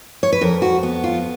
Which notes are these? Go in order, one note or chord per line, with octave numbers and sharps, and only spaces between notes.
C#5
B4
F2 A#4
F#4
B3
F4